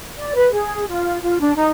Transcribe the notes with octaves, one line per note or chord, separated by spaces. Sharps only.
D5
B4
G#4
F4
F4
D4
D#4